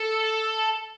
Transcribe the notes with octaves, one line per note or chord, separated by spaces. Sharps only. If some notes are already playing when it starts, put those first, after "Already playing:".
Already playing: A4